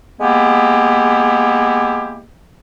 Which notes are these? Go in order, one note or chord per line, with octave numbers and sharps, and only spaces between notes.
G#3 A#3 B3 E4 G4